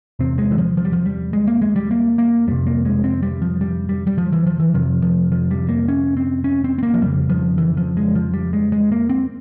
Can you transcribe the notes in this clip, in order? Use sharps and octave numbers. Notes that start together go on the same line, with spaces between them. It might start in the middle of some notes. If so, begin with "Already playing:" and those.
E2 C3 C4
G#3
E3
F3
F3
G3
F3
G3
G#3
A#3
G#3
G3
A#3
A#3
F2 C3 G3
A#3
G#3
C4
G3
F3
G3
G3
G3
F3
E3
F3
E3
F2 C3 F3
F3
F3
G3
A#3
C#4
C4
C#4
C4
C4
A#3
F3
F2 C#3 G3
F3
E3
F3
G#3
F3
G3
G#3
G#3
A#3
C4